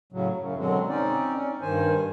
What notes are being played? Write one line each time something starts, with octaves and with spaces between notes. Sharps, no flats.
A2 C#3 F#3
F#2 C#3
B2 D3 F#3 G#3 C4
C4 C#4 D#4 D5
C#4
G2 D#3 C5 G#5